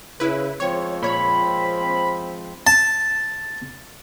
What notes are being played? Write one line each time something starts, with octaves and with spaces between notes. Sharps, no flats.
C#3 E4 B4
F3 G#3 C4 C#5
A#2 C#5 B5
A5